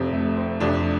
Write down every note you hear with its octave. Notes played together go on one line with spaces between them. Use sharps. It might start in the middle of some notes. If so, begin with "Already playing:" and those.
Already playing: F1 F2 C3 C4
A3
C4
F1 F2 C3 D4